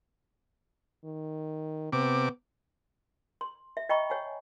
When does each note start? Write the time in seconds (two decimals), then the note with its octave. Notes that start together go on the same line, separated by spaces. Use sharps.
1.05 D#3
1.93 C3 B3 D6
3.41 C6
3.77 E5
3.89 D#5 G5 A#5 B5 C#6
4.10 C#5 F#5 G#5